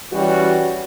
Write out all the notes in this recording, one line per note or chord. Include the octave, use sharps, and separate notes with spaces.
E3 G3 C#4 F#4